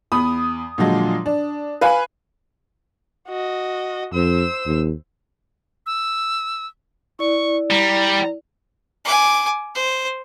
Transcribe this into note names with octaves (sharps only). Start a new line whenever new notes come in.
E2 B5 D#6
A#2 D3 F3 F#3 G#3
D4
B4 F5 G#5 B5
F#4 D#5
F2 C5 E6
D#2
E6
E4 D5 C#6
G3 A#5
G#5 D6
C5